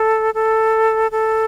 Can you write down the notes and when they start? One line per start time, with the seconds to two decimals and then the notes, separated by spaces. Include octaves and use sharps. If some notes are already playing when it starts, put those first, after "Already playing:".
Already playing: A4
0.34 A4
1.11 A4